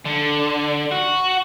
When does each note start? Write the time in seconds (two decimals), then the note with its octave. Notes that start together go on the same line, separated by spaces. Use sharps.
0.05 D3
0.92 F#4